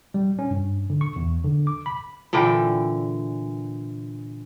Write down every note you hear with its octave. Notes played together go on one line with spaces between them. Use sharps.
G3
C#4
G2
D3
C#6
E2
D3
D6
B5
A#2 D3 E3 G5